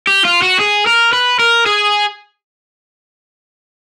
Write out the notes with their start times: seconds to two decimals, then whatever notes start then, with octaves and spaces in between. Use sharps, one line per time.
0.07 G4
0.25 F4
0.43 F#4
0.61 G#4
0.87 A#4
1.13 B4
1.39 A#4
1.66 G#4